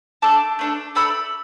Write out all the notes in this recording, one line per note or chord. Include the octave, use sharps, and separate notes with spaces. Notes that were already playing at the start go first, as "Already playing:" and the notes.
A3 D4 A4 A5 D6
A3 D4 A4
A3 D4 A4 B5 E6